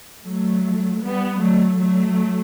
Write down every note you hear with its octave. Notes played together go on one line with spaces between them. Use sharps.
F#3 A3
G3 B3
F#3 A3
F#3 A3